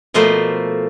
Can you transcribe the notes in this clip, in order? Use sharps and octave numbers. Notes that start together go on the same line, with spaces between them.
B2 F3 A3 A#3 C6